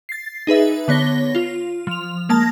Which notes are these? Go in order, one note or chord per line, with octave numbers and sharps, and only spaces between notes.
A6 C7
D#4 G#4 B4 E5
D3 B3 C#5 A#6 G7
F4
F3 F7
G#3 A#3 A5 A#6